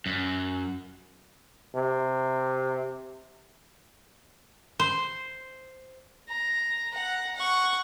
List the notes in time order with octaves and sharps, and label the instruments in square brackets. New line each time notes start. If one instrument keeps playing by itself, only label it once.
[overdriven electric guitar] F#2
[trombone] C3
[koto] C5
[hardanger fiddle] A#5
F#5 A#5
F#5 C#6